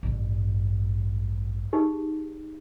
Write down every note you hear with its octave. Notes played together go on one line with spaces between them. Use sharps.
A1 G2
D#4 G4 G#4